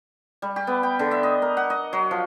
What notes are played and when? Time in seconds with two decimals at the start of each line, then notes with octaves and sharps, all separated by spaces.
0.42 G3
0.56 G4
0.67 B3
0.83 G5
0.99 D3
1.11 E5
1.23 D#5
1.42 A#4
1.57 F#5
1.70 D#5
1.93 F#3
2.11 F3